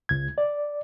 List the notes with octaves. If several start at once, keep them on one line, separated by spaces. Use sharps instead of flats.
C#2 G#6
D5